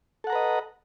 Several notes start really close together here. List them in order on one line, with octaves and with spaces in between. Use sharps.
A4 F#5 A#5 B4 D#5